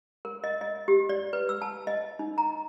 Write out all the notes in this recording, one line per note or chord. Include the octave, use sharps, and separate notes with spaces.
A#4
D#5
D#5
G4
D5
B4
E6
A5
D#5
D#4
A#5